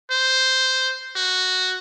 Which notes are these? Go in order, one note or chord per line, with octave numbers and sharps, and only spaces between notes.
C5
F#4